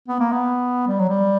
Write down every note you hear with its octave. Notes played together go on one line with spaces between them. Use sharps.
B3
A#3
B3
G3
F#3
G3